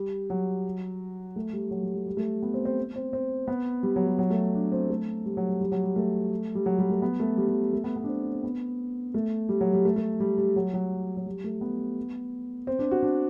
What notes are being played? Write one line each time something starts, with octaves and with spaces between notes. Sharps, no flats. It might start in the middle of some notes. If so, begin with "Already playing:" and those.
Already playing: G3
F#3
A3
G3
F#3
G3
A3
G3
A3
B3
C4
C4
C4
C4
B3
G3
F#3
G3
F#3
A3
D4
C4
A3
G3
F#3
G3
G3
F#3
G3
A3
G3
F#3
G3
A3
B3
A3
G3
G3
A3
B3
B3
D4
C4
C4
B3
A3
G3
F#3
G3
A3
A3
G3
G3
F#3
F#3
F#3
G3
A3
B3
C4
D4
F#4
D4